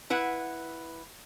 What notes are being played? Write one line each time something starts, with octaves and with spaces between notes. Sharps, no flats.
E4 B4 F#5